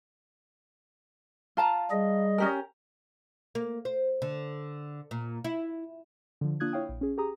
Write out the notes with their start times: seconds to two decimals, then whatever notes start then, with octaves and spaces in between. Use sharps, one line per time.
1.57 F4 A5 A#5
1.91 G3 G#4 D#5
2.38 C#4 G4 A#4
3.55 A#3
3.85 C5
4.22 D3
5.11 A#2
5.44 E4
6.41 D3 F3
6.60 A#3 D4 F4 D#6 F#6 G#6
6.72 E4 C#5 F5 G5 D#6
6.89 A#1
7.01 C#4 G#4
7.17 G4 G#4 A#5 D#6